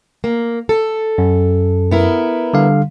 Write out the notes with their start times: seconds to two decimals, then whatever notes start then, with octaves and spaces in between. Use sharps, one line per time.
0.24 A#3
0.69 A4
1.18 F#2
1.91 B3 E4 A#4
2.54 D3 G3 F5